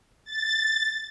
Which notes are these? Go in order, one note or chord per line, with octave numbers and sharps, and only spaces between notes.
A6